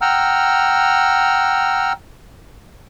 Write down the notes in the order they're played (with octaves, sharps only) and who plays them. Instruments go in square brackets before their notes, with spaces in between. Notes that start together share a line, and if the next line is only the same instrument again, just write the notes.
[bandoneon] F#5 G5 A#5 E6 F6